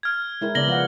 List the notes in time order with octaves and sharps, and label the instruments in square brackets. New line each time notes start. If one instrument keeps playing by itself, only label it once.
[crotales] F6 G#6
[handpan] G#3 E4 A#4
[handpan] C#3 B3 D5 [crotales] A#6 F#7 G7
[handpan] F3 F5 F#5